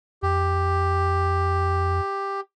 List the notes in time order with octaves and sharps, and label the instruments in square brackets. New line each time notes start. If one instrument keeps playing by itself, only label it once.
[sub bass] F2 [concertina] G4